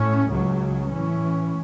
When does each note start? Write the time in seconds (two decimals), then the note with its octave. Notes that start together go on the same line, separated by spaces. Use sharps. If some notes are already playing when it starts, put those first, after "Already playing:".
Already playing: A2 A3 C#4
0.28 C#2 C#3 F#3
0.91 A2 E3 C#4